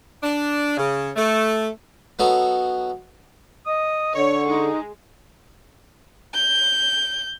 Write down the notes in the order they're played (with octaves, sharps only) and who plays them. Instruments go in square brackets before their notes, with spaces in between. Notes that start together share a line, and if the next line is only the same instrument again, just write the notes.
[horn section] D4
C#3
A3
[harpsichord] F#3 B3 D#4 F#4 A4
[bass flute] D#5 [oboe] D#6
[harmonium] D3 [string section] C#5 [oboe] C#6
[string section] G#3 [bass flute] D#4
[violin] G6